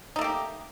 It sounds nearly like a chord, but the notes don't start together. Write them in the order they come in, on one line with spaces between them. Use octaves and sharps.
D#4 A3 A#3 G4